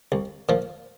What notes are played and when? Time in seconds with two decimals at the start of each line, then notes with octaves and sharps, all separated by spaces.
0.12 C2
0.49 A#2 F3